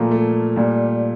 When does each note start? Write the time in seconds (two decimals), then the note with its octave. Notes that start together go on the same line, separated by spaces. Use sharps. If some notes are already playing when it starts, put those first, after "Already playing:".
Already playing: A#2 F3 A3 A#3
0.11 A3
0.56 A#2 G3